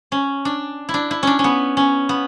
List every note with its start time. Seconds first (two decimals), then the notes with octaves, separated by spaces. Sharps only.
0.12 C#4
0.45 D4
0.89 E4
0.94 D4
1.11 E4
1.23 C#4 D4
1.39 C#4
1.44 B3
1.77 C#4
2.09 B3